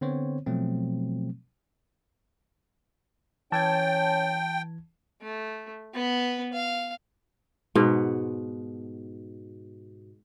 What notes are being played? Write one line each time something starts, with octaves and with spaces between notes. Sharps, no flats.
D3 B3 C4 C5 C#5
B2 F3 F#3 A3 C4
E3 C#4 G5 A5 G#6
A3
B3 B4
F5
G#2 B2 B3